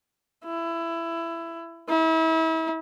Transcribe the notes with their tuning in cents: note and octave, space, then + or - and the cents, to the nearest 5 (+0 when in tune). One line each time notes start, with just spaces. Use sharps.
E4 +20
E4 -35